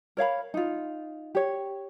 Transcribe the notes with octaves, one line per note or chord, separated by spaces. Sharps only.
A#4 C#5 F5 B5
D#4 F4
G4 C#5